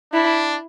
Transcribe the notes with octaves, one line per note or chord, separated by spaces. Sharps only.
D4 E4